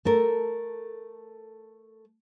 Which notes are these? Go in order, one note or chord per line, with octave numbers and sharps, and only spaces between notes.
A3 A4 A#4